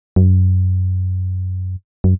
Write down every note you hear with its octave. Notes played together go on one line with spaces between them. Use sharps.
F#2
F#2